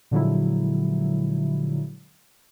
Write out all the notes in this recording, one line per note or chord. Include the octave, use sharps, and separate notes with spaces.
A#2 D3 F3 F#3 G#3 E4